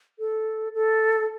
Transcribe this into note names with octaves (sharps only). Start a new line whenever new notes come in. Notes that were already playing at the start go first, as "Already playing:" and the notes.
A4
A4